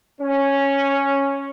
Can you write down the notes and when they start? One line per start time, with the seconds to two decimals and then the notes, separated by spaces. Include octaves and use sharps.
0.21 C#4